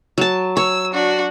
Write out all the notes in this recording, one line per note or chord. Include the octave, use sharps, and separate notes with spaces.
F#3 A5
C#5 E6
D4 F#4